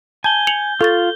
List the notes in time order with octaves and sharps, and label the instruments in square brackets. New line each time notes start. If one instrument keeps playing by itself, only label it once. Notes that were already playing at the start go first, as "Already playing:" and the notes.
[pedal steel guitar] G#5 [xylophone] A5 [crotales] G6 G7
[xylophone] C#7 F7 F#7
[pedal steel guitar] F4 [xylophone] A4 C#6 A6